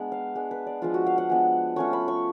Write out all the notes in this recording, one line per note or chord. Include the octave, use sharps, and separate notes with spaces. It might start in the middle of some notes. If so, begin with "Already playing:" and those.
Already playing: G#3 B3 D4
F5
G#3 B3 D4
B4
D5
F3 G#3 B3 D4 F4
F#4
F5
F#5
F3 G#3 B3 D4
A3 C#4 F4 C#6
B5
C#6